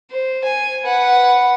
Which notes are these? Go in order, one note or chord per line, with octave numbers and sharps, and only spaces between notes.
C5
G#5
B4 F#5